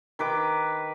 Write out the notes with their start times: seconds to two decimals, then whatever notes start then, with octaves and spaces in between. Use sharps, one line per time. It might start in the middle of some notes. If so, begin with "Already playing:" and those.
0.19 D#3 B4 D6